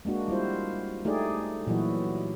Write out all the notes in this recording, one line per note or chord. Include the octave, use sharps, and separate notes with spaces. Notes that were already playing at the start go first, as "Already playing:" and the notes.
G#3 A#3 D4 F#4
G3 E4 F4 C5
A3 D#4 G4 G#4 D5
A#2 E3 F#3 E4 F#4